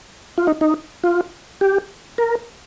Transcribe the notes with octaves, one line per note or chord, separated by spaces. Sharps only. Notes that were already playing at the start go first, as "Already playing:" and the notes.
F4
D#4
D#4
F4
G4
A#4